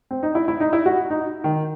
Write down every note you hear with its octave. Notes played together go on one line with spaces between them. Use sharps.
C4
D#4
E4
E4
D#4
E4
F#4
D#4
D#3